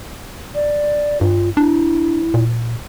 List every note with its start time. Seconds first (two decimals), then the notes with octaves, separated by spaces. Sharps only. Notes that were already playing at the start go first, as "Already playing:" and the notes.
0.55 D5
1.21 G2 F4
1.57 D4 E4
2.34 A#2